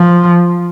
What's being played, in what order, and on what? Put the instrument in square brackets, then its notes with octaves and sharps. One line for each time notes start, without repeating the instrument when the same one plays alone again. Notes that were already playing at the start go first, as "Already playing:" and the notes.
Already playing: [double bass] F3